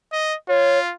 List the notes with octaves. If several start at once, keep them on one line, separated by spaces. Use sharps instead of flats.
D#5
F4 C#5